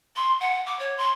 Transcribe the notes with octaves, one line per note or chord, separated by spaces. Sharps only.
C6
F#5
D6
C#5
C6